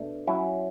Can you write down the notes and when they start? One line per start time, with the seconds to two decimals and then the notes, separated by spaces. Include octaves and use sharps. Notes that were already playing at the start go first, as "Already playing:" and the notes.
Already playing: B2 A3 D4
0.27 F#3 C#4 E4